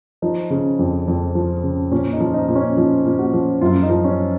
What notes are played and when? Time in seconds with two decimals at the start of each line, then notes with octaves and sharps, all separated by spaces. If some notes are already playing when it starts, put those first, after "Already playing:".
0.22 F3 D#4
0.50 C#3
0.79 F2
1.08 F2
1.35 F3
1.63 C#3
1.92 A#2 C#4
2.13 D#4
2.20 F3
2.34 D#4
2.48 A#2
2.55 C#4
2.77 F3 D#4
3.06 A#2
3.19 F#4
3.34 F3
3.61 F#2 F4
3.83 D#4
3.90 F3
4.04 C#4